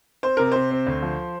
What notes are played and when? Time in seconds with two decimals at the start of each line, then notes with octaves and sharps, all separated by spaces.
0.23 C4 C5
0.37 C3 A#4
0.52 C3 C5
0.71 C4
0.87 D2
1.02 F3